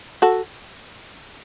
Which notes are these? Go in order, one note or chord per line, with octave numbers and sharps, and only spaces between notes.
F#4 A4